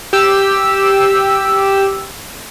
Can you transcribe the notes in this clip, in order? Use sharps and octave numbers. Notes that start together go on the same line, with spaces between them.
G4 E6